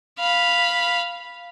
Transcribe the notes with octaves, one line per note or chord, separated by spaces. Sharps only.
F5 B5